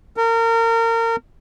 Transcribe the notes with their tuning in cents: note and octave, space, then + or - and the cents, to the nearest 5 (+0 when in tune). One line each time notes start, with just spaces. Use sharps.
A#4 -30